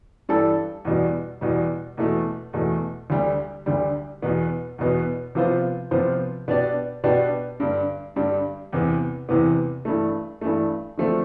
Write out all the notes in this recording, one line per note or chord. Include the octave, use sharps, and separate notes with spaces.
G2 E3 G3 D4 A4
E2 B2 G3
E2 B2 G3
E2 B2 A3
E2 B2 A3
D2 D3 G3
D2 D3 G3
E2 B2 B3
E2 B2 B3
C3 F3 B3 F4 C5
C3 F3 B3 F4 C5
B2 B3 D4 G4 D5
B2 B3 D4 G4 D5
G2 D3 G3
G2 D3 G3
E2 C3 E3 B3
E2 C3 E3 B3
G2 E3 A3
G2 E3 A3
D3 F3 A3 C4